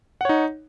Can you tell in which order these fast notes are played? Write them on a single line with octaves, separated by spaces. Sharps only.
F#5 C#5 D#4